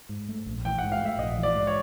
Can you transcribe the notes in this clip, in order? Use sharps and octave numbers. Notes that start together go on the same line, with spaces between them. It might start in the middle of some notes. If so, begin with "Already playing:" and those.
G#2
A3
A#1
E3 G5
G#2 F#5
F5
A3 E5
A#1 D#5
E3
D5
G#2
C#5